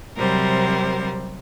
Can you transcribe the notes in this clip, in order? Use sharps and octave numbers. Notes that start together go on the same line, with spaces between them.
C3 F#3 G3 A#4 C5